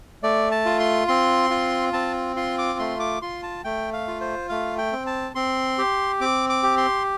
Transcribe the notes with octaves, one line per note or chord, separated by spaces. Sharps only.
A3 D5
A5
F4
C6
C4 C6
F4
C4 A5
F4 C6
D6
A3 C6
D6
F4 C6
A5
A3 G5
F5
F4
C5
A3 F5
G5
C4
A5
C4 C6
G4
C4 D6
D6
G4
C6